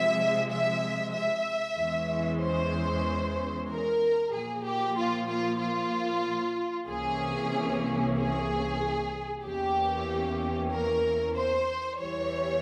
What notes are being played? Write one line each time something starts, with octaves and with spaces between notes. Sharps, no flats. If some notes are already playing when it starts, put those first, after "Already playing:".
Already playing: C3 F3 G#3 E5
E5
E5
E2 E3 G#3 C#4
C5
A#4
A#2 F3 A#3 G#4
G4
F4
F4
F4
C2 C3 E3 A#3 C#4 G#4
G#4
E2 E3 A#3 C#4 G4
A#4
C5
E2 E3 G3 C#5